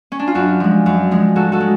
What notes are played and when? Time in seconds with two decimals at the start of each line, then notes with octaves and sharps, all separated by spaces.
0.12 C#4
0.19 D4
0.28 F4
0.35 F#2 D4 F#4
0.60 F3 G#3
0.86 F#2
1.11 F3 G#3
1.36 G#2 F#4 A4
1.52 F#4 A4
1.60 G#3